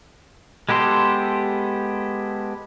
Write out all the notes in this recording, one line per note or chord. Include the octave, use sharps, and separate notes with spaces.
G#3 B3 G4 A4 C6